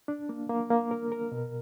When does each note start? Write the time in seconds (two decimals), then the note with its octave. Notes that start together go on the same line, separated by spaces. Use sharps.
0.08 D4
0.29 A#3
0.49 A#3
0.70 A#3
0.91 A#4
1.12 A#4
1.32 B2